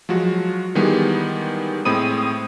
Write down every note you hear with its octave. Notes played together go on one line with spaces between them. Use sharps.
F3 F#3 G#3 F#4
D#3 E3 G3 G#3 B3
A2 G#3 C4 B5 D#6 D#7